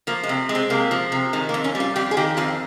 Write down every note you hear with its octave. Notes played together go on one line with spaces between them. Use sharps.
F3 A#3
G#3
C3
G#3
C4
C3 A#3
F3
C3
D#3 G#3
A#3
F2
C#4
G3
F4
F2 G4
G#4
D#3 G4
F2 F4